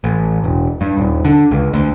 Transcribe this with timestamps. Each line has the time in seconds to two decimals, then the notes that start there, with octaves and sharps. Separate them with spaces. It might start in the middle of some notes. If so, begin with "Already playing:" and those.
0.04 A1
0.44 E1
0.81 G2
0.98 D#1
1.25 D3
1.51 C#2
1.74 D2